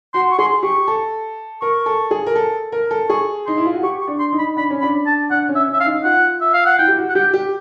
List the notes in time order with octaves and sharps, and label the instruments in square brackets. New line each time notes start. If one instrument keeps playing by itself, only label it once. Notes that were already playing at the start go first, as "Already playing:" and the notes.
[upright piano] F#4 [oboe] C6
[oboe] C#6
[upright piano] G#4 [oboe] C6
[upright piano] G4 [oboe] C#6
[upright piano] A4
[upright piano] A#4 [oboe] C#6
[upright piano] A4
G#4
A#4
A4
A#4
A4
[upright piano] G#4 [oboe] C#6
[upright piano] D#4 [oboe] C6
[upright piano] E4
F4
F#4
[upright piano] G4 [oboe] C#6
[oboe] C#6
[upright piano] D4
[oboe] C6
[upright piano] D#4
[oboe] B5
[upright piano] D4 [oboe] B5
[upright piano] C#4
[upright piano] D4 [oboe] B5
[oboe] A5
[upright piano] D4 [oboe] F#5
[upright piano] C#4
[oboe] E5
[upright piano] C#4
[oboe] E5
F5
[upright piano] D#4
[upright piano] F4 [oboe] F#5
[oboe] E5
F5
F#5
[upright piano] E4 [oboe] G5
[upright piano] G4
F#4
[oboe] F#5
[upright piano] G4 [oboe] G5
[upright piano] G4